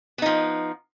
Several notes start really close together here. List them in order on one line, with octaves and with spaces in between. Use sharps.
B3 D#4 F3